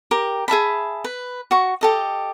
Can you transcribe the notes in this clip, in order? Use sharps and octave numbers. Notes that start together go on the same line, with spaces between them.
G4 A#4
G#4 E5 A5 B5
B4
F#4 C#6
G4 A4 D#5